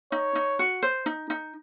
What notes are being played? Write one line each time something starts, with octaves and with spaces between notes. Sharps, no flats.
D#4 C#5
D#4
F#4
C5
D#4
D#4